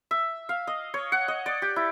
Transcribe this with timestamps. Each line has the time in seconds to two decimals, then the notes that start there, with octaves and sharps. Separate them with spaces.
0.11 E5
0.49 F5
0.67 D#5
0.94 C#5
1.12 F#5
1.28 D#5
1.46 D5
1.62 G4
1.76 E4